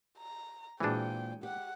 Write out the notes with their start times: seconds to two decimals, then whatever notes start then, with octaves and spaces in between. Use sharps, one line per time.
0.18 A#5
0.80 A#2 E3 G#3 C4 D4 F#4 G#4 G5
1.43 G4 F#5